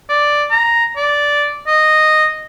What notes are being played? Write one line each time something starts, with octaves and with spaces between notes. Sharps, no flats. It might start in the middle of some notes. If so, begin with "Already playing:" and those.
D5
A#5
D5
D#5